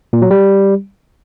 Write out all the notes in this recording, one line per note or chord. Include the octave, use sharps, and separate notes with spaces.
A#2
F#3
G3